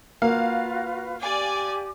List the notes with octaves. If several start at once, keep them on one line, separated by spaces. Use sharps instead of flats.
A#3 F4 F#4 B4 F5
G4 D5 G#5 D6